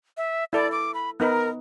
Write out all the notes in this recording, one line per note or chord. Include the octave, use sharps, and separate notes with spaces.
E5
E4 A4 D5
D6
B5
B3 D#4 A#4 B4